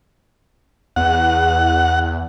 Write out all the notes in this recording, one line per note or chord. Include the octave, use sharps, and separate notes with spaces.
E2 F#5